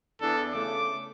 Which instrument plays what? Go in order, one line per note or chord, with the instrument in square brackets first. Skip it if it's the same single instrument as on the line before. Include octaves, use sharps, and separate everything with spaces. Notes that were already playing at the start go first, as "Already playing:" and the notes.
[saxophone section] E2 D4 [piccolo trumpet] A4
[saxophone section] C#3 A3 [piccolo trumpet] D6